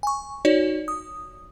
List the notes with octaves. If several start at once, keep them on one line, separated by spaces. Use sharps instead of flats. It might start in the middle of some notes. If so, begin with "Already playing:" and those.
G#5 C#6
D#4 F#4 C#5 D5
D#6